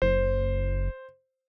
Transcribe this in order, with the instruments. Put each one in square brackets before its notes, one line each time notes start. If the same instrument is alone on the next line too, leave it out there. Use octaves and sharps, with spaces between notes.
[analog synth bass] F#1 [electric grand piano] C5